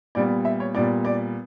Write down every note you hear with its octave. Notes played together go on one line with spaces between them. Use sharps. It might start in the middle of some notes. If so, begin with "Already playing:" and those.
A#2 G3 B3 D5
E5
C#5
A#2 G3 B3 D5
D5